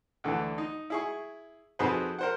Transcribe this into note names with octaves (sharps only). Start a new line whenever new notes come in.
D2 D3 E3
D#4
E4 G#4 C#6
F2 D#4 F#4 G#4 B4 C5
A#4 C5 F#5